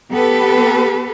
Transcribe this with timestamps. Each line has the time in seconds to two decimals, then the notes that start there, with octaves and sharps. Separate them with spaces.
0.11 B3 G4 A4 B4